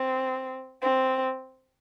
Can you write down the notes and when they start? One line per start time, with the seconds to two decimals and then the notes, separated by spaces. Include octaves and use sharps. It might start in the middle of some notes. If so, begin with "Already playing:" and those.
Already playing: C4
0.82 C4